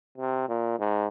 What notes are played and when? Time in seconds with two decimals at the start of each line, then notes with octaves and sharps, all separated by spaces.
0.18 C3
0.48 A#2
0.79 G#2